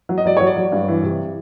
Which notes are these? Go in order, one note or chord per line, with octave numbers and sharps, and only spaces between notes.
F#3
D#5
F#3 D5
F#3 C#5
D5
F#3
G2
E3
C3